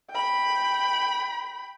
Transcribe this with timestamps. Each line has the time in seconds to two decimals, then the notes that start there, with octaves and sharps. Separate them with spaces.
0.11 G5 B5